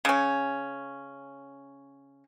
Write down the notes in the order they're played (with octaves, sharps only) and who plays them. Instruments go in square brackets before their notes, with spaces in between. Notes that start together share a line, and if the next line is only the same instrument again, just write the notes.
[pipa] C#3 C#4